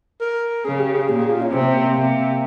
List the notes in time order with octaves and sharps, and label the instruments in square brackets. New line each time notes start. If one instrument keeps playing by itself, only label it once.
[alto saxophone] A#4
[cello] C#3 [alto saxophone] G#4
[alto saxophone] G4
G#4
[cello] A#2 [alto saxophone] G4
[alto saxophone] G#4
F4
C#4
[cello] C3 [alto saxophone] C4
[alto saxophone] C4
A#3
A#3
[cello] C3